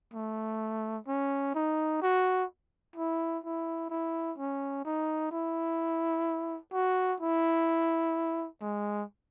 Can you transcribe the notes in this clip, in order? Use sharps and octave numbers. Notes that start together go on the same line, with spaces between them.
A3
C#4
D#4
F#4
E4
E4
E4
C#4
D#4
E4
F#4
E4
G#3